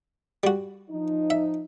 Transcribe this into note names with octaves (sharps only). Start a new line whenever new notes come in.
G3 F#4
F3 D#4
E5